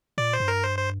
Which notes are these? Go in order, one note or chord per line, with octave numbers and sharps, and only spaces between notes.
A#2 D5
C5
G2
A#4
C5
C5